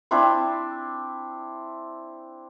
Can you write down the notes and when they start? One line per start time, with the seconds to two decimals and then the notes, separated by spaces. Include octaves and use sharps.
0.11 C4 D4 E4 C5